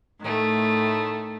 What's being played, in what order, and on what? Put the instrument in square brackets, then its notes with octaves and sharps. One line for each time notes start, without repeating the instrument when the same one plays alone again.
[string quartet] A2 D#3 A3